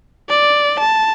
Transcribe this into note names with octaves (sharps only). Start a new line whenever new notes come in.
D5
A5